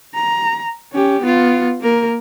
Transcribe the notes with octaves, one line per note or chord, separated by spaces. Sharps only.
A#5
C#4 G4
B3 F4
A#3 A#4